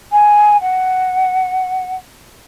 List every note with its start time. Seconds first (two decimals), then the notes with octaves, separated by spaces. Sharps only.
0.12 G#5
0.61 F#5